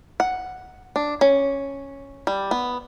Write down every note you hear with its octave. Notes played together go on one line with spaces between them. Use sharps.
F#5
D4
C#4
G3
B3